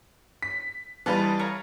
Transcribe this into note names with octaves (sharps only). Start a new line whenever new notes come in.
B6
E3 G3 D#4 F4 B4 A5
C#5 F5 A#5